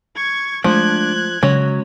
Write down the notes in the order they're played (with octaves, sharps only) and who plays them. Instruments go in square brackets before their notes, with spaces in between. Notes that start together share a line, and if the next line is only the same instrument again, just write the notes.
[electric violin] C#6 G#6
[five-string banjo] F3 [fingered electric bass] G#3 A3 [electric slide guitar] D4 [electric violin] F#6 G#6
[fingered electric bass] C#3 [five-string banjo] F#3 [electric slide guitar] G#3 C#4 C#5